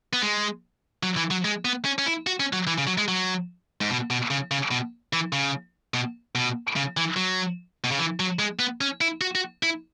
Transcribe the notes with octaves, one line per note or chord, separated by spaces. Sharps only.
B3
G#3
F#3
E3
F#3
G#3
B3
C#4
C#4
E4
F#4
C#4
F#3
E3
C#3
F#3
G#3
F#3
G#2
B2
B2
C#3
C#3
B2
E3
C#3
B2
B2
C#3
E3
F#3
B2
C#3
E3
F#3
G#3
B3
C#4
E4
F#4
F#4
E4